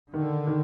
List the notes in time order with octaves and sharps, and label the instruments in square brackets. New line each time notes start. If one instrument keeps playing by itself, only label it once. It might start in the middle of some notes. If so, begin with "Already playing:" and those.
[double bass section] D3 [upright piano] D#3
[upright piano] D#3